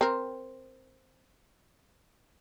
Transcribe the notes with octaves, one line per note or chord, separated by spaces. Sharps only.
C4 A#4